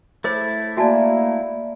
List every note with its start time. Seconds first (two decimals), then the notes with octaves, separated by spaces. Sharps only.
0.24 A3 E4 G#4 C5 C#5 A6
0.77 A#3 F#4 D5 E5 G#5 A5